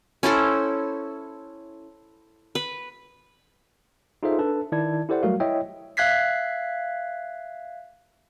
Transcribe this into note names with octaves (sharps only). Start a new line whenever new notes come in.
C#4 E4 A4 C5
B4
D#4 F4 G#4 A4 C5 E5
D4 A4 B4 A5
D#3 E4 D5 A5 G#6
E4 G4 A4 C5 D5 F#5
F#3 G3 A3 F#4 A#4 F5
E4 C#5 D#5 E5 G5
E5 F5 F#6 G#6 B6 C7